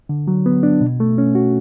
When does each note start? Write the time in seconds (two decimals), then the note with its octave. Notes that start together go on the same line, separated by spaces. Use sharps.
0.09 D3
0.28 F#3
0.46 B3
0.63 D4
0.81 B2
1.00 A3
1.18 C#4
1.35 F#4